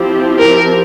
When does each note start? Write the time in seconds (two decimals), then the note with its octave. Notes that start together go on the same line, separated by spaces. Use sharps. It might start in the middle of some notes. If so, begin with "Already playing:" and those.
Already playing: F3 C4 E4 G4
0.39 A#4